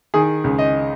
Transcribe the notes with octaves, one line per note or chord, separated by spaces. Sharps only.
D#3 G#4
C#2
D#5